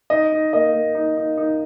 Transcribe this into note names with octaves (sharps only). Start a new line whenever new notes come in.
D#4 D#5
D#4
A#3 D#5
A#3
D#4
D#4
D#4